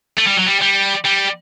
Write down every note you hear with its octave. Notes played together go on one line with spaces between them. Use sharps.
A3
G3
F#3
G3
G3
G3